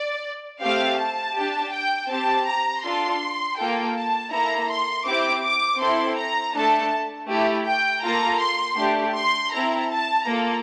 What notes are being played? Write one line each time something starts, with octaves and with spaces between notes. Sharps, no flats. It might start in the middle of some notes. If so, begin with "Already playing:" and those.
Already playing: D5
A3 C4 G4 F5
A5
D4 G4
G5
C4 G4 A5
A#5
D4 F4 A4 C6
A#3 F4 A4 G5
A5
A#3 E4 A4 A#5
C6
C4 E4 G4 D6
D6
C4 E4 A4 C6
A#5
A3 D4 A4 A5
A3 E4 G4
G5
A#3 F4 A4 A#5
C6
A3 D4 G4
C6
C4 E4 A4 A#5
A5
A#3 F4 A4 A#5